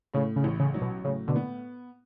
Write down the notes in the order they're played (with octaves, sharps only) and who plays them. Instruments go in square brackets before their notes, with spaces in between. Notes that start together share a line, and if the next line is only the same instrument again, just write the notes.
[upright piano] A2 [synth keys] C#3
[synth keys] C#3
[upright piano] A1
[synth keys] C#3
[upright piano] F#3
[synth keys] B2
[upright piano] A2 [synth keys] C#3
[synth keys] B2 D3
[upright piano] B3